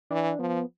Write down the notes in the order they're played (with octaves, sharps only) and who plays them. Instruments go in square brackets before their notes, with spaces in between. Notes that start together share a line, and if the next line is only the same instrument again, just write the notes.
[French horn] E3 [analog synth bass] D4
[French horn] F3 [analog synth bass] B3